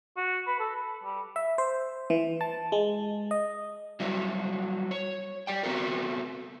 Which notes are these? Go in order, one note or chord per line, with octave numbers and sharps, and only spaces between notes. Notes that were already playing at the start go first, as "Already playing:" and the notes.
F#4
B4
A4
B4
G3
E5
C5
E3
A5
G#3
D#5
F#3 G3 E4 F#4
C#5
G4 D5 G5
A3 B3 C4 F#4 A4 A#4